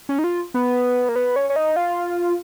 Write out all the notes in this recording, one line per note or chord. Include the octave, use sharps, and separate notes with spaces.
C#4
D#4
F4
B3
A#3
B3
C#4
C#4
D#4
F4